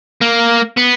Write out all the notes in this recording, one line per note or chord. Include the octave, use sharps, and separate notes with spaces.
A#3
B3